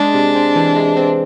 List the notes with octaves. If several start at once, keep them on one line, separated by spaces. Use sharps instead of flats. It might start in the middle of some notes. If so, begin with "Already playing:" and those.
Already playing: G#3 D4
C3
C4
E3
G#3
C4